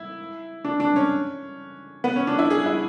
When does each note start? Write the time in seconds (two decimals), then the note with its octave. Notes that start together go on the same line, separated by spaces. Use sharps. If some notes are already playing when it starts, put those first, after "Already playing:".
Already playing: E4
0.65 D4
0.80 D4
0.96 C#4
2.04 B3
2.16 C#4
2.27 D4
2.39 E4
2.50 G#4
2.66 E4